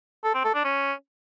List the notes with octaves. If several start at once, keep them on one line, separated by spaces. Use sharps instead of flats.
A4
C4
A4
D4
C#4